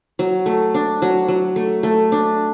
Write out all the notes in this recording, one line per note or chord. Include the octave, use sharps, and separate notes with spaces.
F#3
A3
D4
F#3
F#3
A3
A3
D4